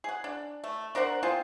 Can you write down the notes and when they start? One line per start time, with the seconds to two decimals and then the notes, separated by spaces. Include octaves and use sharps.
0.04 G#4 F#5
0.24 D4
0.64 A3
0.95 D4 A#4 C5 F#5
1.23 C4 F4 G#4